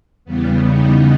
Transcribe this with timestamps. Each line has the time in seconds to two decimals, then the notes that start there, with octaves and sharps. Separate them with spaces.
0.25 E2 C#3 G3 B3
0.64 D#4